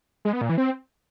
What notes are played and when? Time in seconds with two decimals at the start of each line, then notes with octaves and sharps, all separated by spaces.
0.25 G#3
0.33 B3
0.41 A#2
0.49 E3
0.58 C4